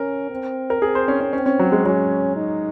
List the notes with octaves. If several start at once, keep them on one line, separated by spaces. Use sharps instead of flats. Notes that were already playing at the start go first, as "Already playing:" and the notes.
Already playing: C#4 A#4
C4
A#4
C4 G#4
C5
C#4
C#4
C4 C#4
C#4
F#3
G#3
F#3 C#4
D#4